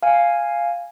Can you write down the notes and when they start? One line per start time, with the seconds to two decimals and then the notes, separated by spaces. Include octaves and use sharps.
0.03 F5 G#5